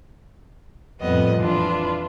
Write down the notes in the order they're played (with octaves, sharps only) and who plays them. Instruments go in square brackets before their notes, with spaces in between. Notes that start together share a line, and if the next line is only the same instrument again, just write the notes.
[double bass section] F2 A2 [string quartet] G3 B3 D#5
[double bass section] E3 [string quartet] D4 F4 B4